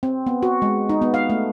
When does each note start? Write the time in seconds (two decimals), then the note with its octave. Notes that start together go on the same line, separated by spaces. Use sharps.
0.03 C4
0.27 B3
0.43 F#4
0.62 G#3
0.89 D#4
1.02 B3
1.14 F5
1.30 A3